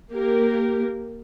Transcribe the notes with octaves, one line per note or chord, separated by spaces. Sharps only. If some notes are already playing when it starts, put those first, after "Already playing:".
A#3 G4 A#4